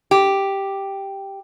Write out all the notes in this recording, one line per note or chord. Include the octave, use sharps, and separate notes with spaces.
G4